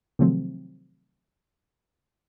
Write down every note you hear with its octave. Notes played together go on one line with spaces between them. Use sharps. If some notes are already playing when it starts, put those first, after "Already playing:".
C3 D#3 F3 F#3 A3 C4